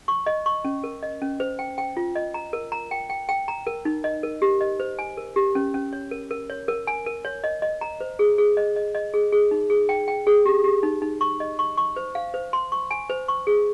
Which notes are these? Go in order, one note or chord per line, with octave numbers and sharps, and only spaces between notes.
C#6
D#5
C#6
C#4
A#4
D#5
C#4
C5
G5
G5
F4
D#5
A#5
A#4
A#5
G5
G5
G5
A#5
A#4
D#4
D#5
A#4
G4
D#5
C5
G#5
A#4
G4
C#4
C#4
C#5
A#4
A#4
C#5
A#4
G#5
A#4
C#5
D#5
D#5
A#5
C5
G#4
G#4
D#5
D#5
D#5
G#4
G#4
D#4
G#4
G5
G5
G#4
G4
G4
D#4
D#4
C#6
D#5
C#6
C#6
C5
F5
C5
C6
C#6
G#5
C5
C#6
G#4